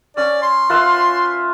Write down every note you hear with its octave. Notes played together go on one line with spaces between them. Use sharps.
C#4 D5
C6
F4 B4 E5